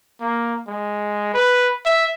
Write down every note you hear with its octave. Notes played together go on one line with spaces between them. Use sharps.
A#3
G#3
B4
E5